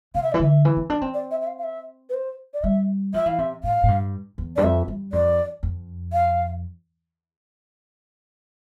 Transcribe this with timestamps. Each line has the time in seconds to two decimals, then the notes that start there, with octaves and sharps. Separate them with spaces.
0.15 C3 F5
0.23 E5
0.32 E3 D5
0.39 D3 E5
0.65 E3
0.77 C4
0.90 D4
1.01 C4
1.14 D5
1.31 E5
1.41 E5
1.47 F5
1.58 F5
1.64 E5
2.10 B4
2.14 C5
2.54 D5
2.63 G3 E5
3.14 F3 E5
3.26 E3 F5
3.38 C3 E5
3.64 A2 F5
3.83 A2
3.88 G2
4.38 E2
4.56 G2 D5
4.63 F2 E5
4.88 G2
5.13 F2 D5
5.63 F2
6.13 F5